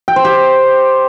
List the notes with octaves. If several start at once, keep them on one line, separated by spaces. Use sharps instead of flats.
G5
C5
G4